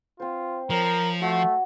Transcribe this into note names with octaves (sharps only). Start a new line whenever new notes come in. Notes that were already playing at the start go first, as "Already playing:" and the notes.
C4 F4 C5
F3 A#4 C#5 E6
A3 F#4